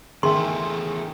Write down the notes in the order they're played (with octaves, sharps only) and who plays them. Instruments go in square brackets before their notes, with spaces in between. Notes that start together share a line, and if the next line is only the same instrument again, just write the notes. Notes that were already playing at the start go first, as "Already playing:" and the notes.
[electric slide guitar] E2 A3 [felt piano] D#3 [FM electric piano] G#4 E5 [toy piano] C6